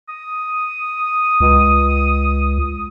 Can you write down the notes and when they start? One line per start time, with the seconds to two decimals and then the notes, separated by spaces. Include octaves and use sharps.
0.09 D#6
1.41 C#2